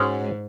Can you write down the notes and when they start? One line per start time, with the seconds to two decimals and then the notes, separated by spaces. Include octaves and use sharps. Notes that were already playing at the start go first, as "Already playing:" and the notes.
Already playing: G#2 G#3 C#4 F#4 C#5